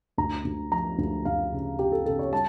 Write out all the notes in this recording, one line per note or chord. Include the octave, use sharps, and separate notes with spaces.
D2 A#5
D2
F3 A#5
D2
D2 F5
C#3
C#3 G4
A4
C#3 A4
C#5
G3 A5